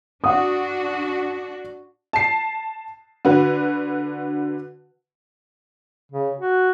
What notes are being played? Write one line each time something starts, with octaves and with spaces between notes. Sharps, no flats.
D4 F#4 F#5 D#6
A5 C7
D3 F#4 B4
C#3
F#4